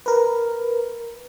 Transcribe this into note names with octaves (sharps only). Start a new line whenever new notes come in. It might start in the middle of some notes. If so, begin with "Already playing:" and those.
A#4 B4